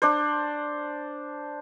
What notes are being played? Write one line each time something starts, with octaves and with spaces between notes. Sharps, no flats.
D4 C5